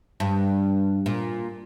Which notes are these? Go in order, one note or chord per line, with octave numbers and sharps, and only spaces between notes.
G2
A#2